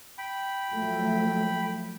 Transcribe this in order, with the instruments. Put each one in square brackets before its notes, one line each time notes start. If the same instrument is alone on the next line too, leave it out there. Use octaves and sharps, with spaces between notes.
[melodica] G5 B5
[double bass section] F3 F#3 A3